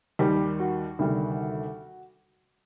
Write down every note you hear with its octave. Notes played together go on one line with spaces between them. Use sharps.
D#2 D#3 G3 G4
F#4
D2 C3 D#3 G3